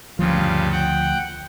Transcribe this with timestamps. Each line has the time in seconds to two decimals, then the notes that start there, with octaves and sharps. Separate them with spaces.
0.19 D2 G2 C#3 F3 F4
0.72 F#5 G5